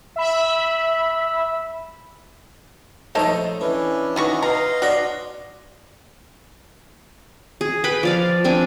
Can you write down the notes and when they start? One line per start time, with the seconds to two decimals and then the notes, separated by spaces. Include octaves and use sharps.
0.16 E5 B5
3.15 A#1 A3 D#4 A4 C5 C#5 D#5
3.61 E3 C#4 D4 E4
4.16 D#3 B3 F#4 C#6
4.43 B2 D#5 F5 A#5 C6
4.82 D4 F#4 C#5 D5
7.61 G#4
7.84 B4 G5 B5
8.03 F3 D5 F5
8.44 C4 D4 G#5